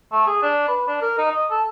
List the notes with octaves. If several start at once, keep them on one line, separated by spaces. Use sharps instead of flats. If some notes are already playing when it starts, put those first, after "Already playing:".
A3
G#4
D4
B4
D4
A#4
D#4
D#5
A4